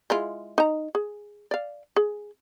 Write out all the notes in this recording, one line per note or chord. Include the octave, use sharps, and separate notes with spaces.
G#3 E4 F4
D#4 A#5
G#4
D5 F5
G#4